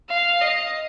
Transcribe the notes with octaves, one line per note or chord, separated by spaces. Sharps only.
F5
D#5